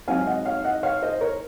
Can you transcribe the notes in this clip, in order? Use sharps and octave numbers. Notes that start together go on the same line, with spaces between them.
G#2 F#3 C4 D#4 F5 G#5
D#5 F#5
C#5 F5
D#5 F#5
C#5 F5
C5 D#5
A#4 C#5